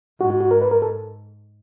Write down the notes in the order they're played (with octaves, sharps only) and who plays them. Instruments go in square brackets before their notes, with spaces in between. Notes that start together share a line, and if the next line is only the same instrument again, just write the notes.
[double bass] G#2 [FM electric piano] F#4
[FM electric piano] F#4
F#4
A#4
B4
A#4
A4